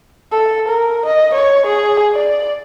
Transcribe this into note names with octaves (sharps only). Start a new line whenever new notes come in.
A4
A#4
D#5
C#5
G#4
D5